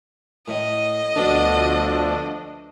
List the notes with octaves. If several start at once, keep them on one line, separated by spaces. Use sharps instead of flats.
A2 D#5
D2 B2 D3 F3 A3 D4